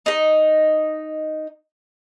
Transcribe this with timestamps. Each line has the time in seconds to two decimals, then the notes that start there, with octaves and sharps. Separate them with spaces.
0.06 D#4 D#5